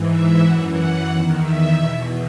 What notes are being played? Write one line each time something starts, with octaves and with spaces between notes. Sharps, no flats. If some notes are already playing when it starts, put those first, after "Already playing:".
Already playing: G#2 E3
E5
F#2 E3 F#5
F#5
E2 D#3
E5
E2 B2 E5